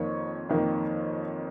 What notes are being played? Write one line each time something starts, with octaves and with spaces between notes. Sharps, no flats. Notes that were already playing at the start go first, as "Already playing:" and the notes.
Already playing: F2 D#3 A#3 C#5 C#6
F2 D#3 A#3